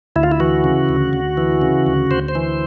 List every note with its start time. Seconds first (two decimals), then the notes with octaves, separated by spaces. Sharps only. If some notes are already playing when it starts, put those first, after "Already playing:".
0.16 D2 E4
0.23 F4
0.32 E4
0.40 E3 F#4
0.64 C#3
0.89 D2
1.13 D2
1.37 E3
1.62 C#3
1.86 D2
2.11 D2 C5
2.28 C5
2.35 E3